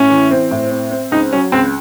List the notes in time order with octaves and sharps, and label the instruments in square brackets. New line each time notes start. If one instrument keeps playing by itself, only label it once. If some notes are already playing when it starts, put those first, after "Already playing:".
Already playing: [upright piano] A2 [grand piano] C#4
[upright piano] E3
C4
A2
C4
C4
[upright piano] C#2 [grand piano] D#4
[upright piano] F#3 [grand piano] C#4
[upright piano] C#2 [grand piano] C4